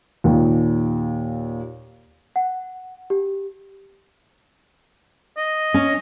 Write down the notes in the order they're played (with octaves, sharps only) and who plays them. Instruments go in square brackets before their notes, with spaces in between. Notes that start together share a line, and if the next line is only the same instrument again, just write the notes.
[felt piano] D#2 A#2
[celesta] F#5
G4
[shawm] D#5
[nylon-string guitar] C#4